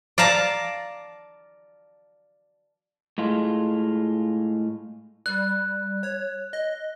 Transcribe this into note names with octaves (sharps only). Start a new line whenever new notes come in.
D5 F5 A5 A#5
A2 G#3 F4
G3 F#6
C#5
D#5